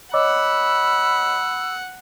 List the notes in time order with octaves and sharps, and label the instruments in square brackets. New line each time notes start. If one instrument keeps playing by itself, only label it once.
[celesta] C#5 D#5 D6 [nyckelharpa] F#5 [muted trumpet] B5 [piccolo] E6